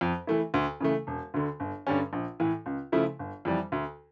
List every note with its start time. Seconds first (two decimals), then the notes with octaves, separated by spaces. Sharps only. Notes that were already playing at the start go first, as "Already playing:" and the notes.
0.01 F2
0.27 E3 A3 E4
0.54 D2
0.80 C#3 E3 A3
1.07 E1
1.34 D2 D3
1.60 G1
1.87 G2 D3 G3 C#4
2.13 A#1
2.40 A2 E3
2.66 C#2
2.92 C#3 F3 A3 E4
3.19 G1
3.45 F2 E3 G3
3.72 D2